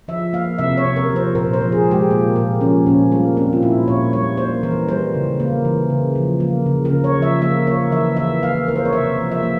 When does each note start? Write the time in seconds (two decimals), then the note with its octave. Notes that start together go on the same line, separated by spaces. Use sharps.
0.08 F3 E5
0.33 A#3 F5
0.58 C3 E5
0.77 C#5
0.85 C3
0.96 A#4
1.10 F3
1.16 C5
1.35 A#2 A#4
1.53 C5
1.61 F3
1.72 G#4
1.86 G#3
1.91 G4
2.10 A#2 A#3
2.36 A#2 A#3
2.61 F3 C#4
2.87 A#2 C#4
3.12 G3 A#3
3.37 A#3 C4
3.53 F4
3.62 A#2 E4
3.88 A#2 C#5
4.13 G3 C#5
4.38 A#3 C5
4.63 E3 A#4
4.88 G3 C5
5.14 C#3
5.40 A#3
5.65 E3
5.90 C#3
6.15 F3
6.40 A#3
6.66 C#3
6.85 A#4
6.90 C#3
7.04 C#5
7.16 F3
7.22 E5
7.41 A#3 E5
7.67 A#3 C#5
7.92 E3 E5
8.17 E3 E5
8.43 A#3 F5
8.68 A#3 A#4
8.76 C5
8.85 C#5
8.93 C3 E5
9.18 F3
9.32 E5
9.43 A#3